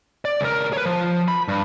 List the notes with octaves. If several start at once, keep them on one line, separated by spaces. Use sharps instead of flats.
D5
C#2 A#4
B4 C#5
F3
B5
G2